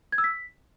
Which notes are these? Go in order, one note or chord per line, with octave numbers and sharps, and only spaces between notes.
G#6
E6
B6